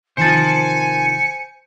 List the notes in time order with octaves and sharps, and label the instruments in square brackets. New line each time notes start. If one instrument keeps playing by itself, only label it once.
[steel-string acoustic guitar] C3 D#3 F3 [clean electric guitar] C5 A5 [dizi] G#5 [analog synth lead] C#7